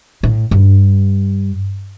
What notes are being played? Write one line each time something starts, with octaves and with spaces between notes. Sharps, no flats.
A2
G2